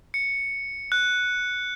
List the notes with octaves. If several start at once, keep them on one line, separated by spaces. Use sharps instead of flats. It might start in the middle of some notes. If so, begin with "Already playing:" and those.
C#7
F#6